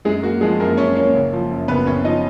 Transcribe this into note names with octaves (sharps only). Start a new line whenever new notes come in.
F#2 G#3 G#4
A#3 F#4
F3 G#3 G#4
F#2 A#3 A#4
F#2 C#4 C#5
A#3 C#4 C#5
F#1
F3
F#2
F#1 B3 B4
F#1 C#4 C#5
F3 D#4 D#5